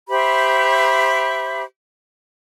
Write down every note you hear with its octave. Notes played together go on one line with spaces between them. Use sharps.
G4 C5 E5 B5